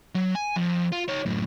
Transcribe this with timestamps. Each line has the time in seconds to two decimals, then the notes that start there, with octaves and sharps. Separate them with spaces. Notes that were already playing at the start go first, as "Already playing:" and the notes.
0.15 F#3
0.35 G#5
0.56 F2
0.92 F4
1.09 D#4 C#5
1.26 F#2 A2